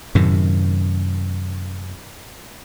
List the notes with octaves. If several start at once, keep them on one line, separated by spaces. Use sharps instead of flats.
F#2 A2 C3 D#3